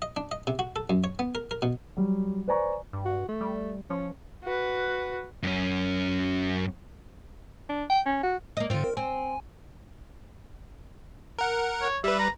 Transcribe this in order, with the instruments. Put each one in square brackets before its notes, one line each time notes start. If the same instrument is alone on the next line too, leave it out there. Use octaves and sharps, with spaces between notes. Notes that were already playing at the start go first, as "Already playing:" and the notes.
[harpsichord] D#5
D4
D#5
C3
F#4
A4
F#2
C#5
B3
A#4
A#4
B2
[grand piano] F#3 G3
B4 C5 D5 G#5 A#5 C#6
[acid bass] G2
[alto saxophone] F#4
A3
[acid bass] G3
[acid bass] F3 [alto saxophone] C#4
[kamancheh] F#4 B4
[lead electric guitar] F#2 C#4
[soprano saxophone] D4
G5
C#4
F#4
[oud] A#3 D#5
[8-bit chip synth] G#2 D3 [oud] C4 F4
[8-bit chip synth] A#4
[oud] C4 [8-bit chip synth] G#5
[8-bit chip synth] A#4 F#5
[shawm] C#5
[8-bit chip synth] G3 B4 [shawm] E5
[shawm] A#5